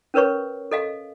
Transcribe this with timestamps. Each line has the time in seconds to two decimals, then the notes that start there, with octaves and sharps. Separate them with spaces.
0.14 C#4 A#4 B4 C#5 C#6
0.71 A4 D#5 F5